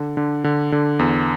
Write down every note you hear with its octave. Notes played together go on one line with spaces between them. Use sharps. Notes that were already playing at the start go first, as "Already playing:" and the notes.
Already playing: D3
D3
D3
D3
E2